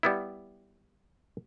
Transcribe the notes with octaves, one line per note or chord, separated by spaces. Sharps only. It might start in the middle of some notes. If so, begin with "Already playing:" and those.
G3 B3 E4